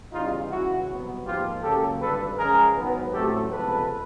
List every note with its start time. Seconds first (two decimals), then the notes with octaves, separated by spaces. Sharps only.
0.12 E2 C#3 E3 G3 D#4 F4
0.50 C#2 C#3 E3 E4 F#4
0.87 C2 B2 F#3 B3
1.25 G#1 G#2 F3 A#3 F4 G4
1.63 C#2 C#3 F#3 A#3 G4 A4
2.00 G#1 G2 D3 A4 B4
2.38 C#2 C#3 F3 G#3 G#4 A#4
2.75 G#2 D#3 F#3 B3
3.12 A1 A2 F#3 A3 C4 G4 A4
3.50 C#2 C3 F3 G#3 B3 A4 B4